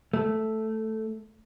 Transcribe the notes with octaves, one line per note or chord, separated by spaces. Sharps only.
A3